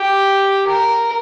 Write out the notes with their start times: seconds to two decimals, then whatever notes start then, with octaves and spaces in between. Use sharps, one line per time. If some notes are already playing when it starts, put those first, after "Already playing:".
Already playing: G4
0.67 A#4